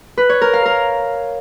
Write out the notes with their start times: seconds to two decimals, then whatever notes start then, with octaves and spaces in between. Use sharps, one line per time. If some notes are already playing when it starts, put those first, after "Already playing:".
0.18 B4
0.29 C#5
0.41 A#4
0.53 F5
0.65 A#4